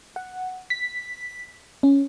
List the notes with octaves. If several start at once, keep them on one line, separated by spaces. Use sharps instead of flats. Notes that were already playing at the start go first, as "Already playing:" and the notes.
F#5
B6
C#4